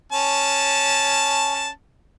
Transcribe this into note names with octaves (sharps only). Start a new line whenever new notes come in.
C#4 A5